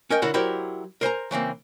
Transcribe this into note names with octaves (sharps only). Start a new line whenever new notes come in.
C#4 A#4 D#5 G5
D3 E4 F#4 A#4 C#5
F#3 E4 G4 A#4 C5 D5
A#4 C5 G#5 A#5
C#3 E3 A#3 C4